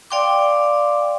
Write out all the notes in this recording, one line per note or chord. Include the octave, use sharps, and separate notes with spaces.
D5 F5 G5 C6 D6